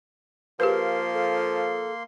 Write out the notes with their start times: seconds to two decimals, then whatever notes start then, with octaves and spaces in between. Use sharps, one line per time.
0.60 F3 A#3 G4 G#4 A#4 B4 C6
1.13 A4